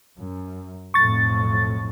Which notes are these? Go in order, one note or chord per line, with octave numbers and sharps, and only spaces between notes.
F#2
B1 F2 A2 C#6 A6